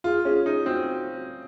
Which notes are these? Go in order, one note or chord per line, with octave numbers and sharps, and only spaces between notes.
F4 G#4
C#4 G#4
D#4 G#4
C4 F#4